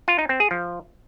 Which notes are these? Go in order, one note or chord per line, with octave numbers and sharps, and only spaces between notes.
F4
D#4
C4
G#4
F3